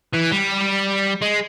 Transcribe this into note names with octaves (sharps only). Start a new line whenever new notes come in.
E3
G3
G#3